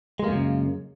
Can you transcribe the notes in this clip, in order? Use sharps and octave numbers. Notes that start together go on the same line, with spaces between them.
F#2 C#3 G#3 A#3